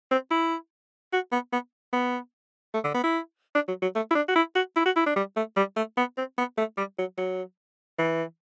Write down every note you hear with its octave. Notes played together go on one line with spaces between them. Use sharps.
C4
E4
F#4
B3
B3
B3
A3
D3
B3
E4
D4
F#3
F#3
A3
E4
D4
F#4
E4
F#4
E4
F#4
E4
D4
G3
A3
G3
A3
B3
C4
B3
A3
G3
F#3
F#3
E3